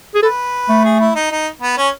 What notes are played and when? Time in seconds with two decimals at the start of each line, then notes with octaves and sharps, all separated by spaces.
0.15 G#4
0.23 A4 B4
0.69 A3
0.84 G#4
1.00 E4
1.15 D#4
1.31 D#4
1.61 B3
1.77 C#4